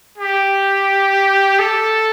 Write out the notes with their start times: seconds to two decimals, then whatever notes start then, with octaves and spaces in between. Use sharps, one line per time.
0.18 G4
1.59 A4